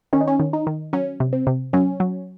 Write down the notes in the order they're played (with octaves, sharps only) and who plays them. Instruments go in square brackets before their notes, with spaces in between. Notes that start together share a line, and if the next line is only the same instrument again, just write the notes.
[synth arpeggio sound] D#3 [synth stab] C#4
[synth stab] D#4
C#4
[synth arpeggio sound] D#3
[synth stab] D#4
[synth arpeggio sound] D#3
[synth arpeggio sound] F#3 [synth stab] C#4
[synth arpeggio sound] C3
[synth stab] C4
[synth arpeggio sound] C3
[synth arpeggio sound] F#3 [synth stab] C#4
[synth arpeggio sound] F#3